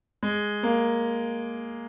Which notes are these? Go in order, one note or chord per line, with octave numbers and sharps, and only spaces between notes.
G#3
A#3